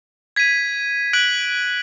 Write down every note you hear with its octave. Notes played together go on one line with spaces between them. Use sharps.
G#6 B6 D#7
F#6 B6 D7 F#7